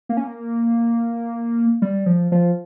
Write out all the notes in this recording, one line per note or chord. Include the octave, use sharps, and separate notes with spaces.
A#3
C#4
A#3
G3
F3
F3